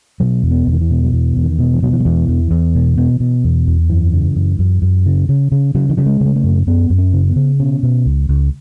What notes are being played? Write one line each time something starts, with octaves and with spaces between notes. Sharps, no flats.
B2 F#3
E2
B3
E2 D#3
E3
B2
F#3
E2 E3
E2
D#3
B2
E3
B2 F#3
E3
F#3
E2 E3
E2
E2
B2
B2
B2
E2
E2
F#2 E3
C#3
F#2
F#2
F#2
C#3
C#3
C#3
C#3 F#3
E3
C#3 F#3
G#3
C#3 G#3
A3
F#2
F#2 B3
F#2
C#4
C#3
B3
C#3
B2 C#4
B2
C#2
C#2